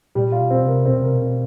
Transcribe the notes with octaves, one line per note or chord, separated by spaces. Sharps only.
A#2 G3
F4
B2
C4
C3
A#4
B2 C4
C3 A#4
B2
C4